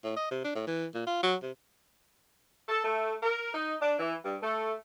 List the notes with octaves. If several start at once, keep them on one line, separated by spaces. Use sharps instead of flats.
A2
D#5
C3
D4
A2
E3
A#2
F4
F#3
C3
A4
A3
A#4
D#4
D4
E3
G2
A3